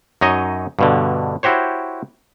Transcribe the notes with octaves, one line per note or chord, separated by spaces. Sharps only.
F#2 D#4 C#5 D#5
G2 B2 D3
E4 F#4 G4 C5 C#5